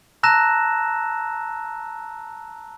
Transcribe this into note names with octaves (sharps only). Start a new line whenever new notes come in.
A5 A#5 E6 F#6 A#6 E7